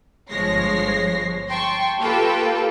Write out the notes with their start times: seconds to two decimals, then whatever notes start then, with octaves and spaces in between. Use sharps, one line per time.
0.30 G1 F3 G#3 C#5 A#6 C7
1.49 G5 A5 C6 C#6
2.01 A#3 F4 G4 A4 B4 G5